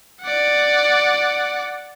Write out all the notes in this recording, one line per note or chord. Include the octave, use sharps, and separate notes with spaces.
D5 F#5